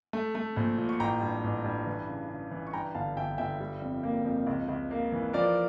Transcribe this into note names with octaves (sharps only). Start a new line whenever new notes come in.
A3
A3
A#1
A#2
C#6
A1 G5 A#5
G2
A1
G2
E3
C#3
C#3
E3
C#6
G2 G5 A#5
G1 F5 A5
G1 E5 G5
G1 E5 G5
G3
F2
A#3
F2
C#2
C#2
A#3
E3
F3 A#4 D5